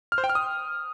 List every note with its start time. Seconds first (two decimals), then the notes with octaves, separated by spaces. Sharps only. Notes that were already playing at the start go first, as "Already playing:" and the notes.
0.12 F6
0.18 C5
0.24 G5
0.30 F6
0.35 D#6